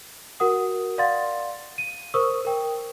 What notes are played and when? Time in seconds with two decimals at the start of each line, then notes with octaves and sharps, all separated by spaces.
0.40 F#4 A#4 F#5 D#6
0.98 D5 F5 F#5 C6 A6
1.78 D#7
2.14 A#4 C5 C#6 D#6 E6
2.45 A#4 G5